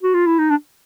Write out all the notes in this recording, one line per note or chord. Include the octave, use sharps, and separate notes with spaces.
F#4
F4
E4
D#4
D4